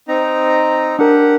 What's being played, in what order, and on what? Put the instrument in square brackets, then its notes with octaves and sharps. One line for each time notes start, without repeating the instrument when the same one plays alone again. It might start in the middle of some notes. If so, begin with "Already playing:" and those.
[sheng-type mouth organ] C4 D#4 A#5
[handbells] D4 A#4 [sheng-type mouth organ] G4 F#5